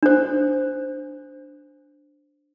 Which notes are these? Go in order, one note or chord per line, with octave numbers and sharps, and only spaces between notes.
D4 C5